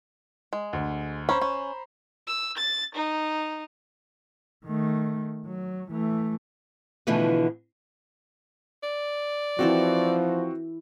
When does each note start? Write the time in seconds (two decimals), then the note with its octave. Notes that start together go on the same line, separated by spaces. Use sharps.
0.53 G#3
0.73 D2
1.29 C#4 C5 A#5 B5
1.41 C#4
2.28 E6
2.58 A6
2.95 D#4
4.66 D#3 A3
5.47 F#3
5.91 E3 A3
7.07 B2 D3 E3 F3 A3 B3
8.83 D5
9.59 E3 F3 C4 F#4 A4 G5